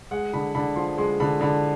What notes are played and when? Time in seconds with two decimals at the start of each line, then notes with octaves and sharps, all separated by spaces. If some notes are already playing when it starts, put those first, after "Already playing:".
0.11 G#3 F#5
0.33 D3 B5
0.55 D3 B5
0.76 F3 C6
0.98 G#3 C6
1.20 D3 B5
1.41 D3 B5